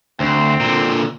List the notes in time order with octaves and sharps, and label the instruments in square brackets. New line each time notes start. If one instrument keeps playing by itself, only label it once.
[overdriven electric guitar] D2 [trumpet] C4
[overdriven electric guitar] A#2 D3